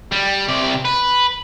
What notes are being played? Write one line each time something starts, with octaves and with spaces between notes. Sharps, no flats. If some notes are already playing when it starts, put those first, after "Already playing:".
G3
C3 D5
B4